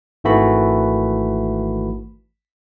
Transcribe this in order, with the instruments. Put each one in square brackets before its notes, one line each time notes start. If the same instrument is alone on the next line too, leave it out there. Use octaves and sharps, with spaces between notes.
[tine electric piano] G#1 D#3 E3 A3 F#4 B5